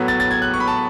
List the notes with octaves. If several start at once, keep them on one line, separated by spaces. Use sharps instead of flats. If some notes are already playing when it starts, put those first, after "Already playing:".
Already playing: A2 F#3 B3
A6
A6
G#6
F#6
C#6
B5
A5